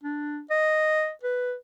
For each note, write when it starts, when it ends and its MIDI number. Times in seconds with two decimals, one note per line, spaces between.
0.03 0.41 62
0.50 1.11 75
1.23 1.54 71